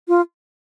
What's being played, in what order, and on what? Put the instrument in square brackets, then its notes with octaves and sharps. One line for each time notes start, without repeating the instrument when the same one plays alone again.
[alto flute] F4